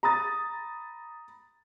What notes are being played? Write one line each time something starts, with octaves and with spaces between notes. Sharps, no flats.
A#5 B5 D#6 A6